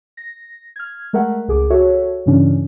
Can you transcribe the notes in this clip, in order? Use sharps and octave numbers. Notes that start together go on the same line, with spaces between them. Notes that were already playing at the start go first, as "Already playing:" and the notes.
A#6
F6 G#6
G#3 A3 A#4 E5 F#5
C#2 G#4 D6
F#4 A4 C#5 E5
G2 C#3 E3 C#4 D4